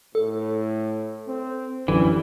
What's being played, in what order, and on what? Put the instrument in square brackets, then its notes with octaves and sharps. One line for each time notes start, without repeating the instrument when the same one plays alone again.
[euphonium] A2 [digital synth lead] A4
[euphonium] C4
[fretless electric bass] F#2 D3 [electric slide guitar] E3 [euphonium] G3